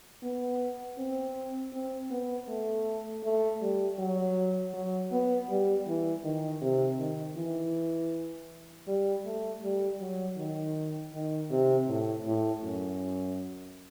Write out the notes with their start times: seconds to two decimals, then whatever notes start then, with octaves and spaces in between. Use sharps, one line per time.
0.23 B3
0.98 C4
1.73 C4
2.10 B3
2.48 A3
3.23 A3
3.61 G3
3.99 F#3
4.74 F#3
5.12 B3
5.49 G3
5.87 E3
6.24 D#3
6.61 C3
6.99 D#3
7.37 E3
8.87 G3
9.25 A3
9.63 G3
10.00 F#3
10.37 D#3
11.13 D#3
11.50 C3
11.88 A2
12.26 A2
12.63 F#2